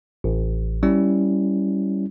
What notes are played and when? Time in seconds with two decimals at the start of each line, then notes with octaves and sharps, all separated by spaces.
0.24 A1
0.83 G3 C#4 E4